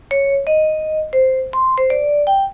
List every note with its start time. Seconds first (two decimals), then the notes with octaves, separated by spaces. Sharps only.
0.11 C#5
0.47 D#5
1.13 C5
1.53 C6
1.78 C5
1.90 D5
2.27 G5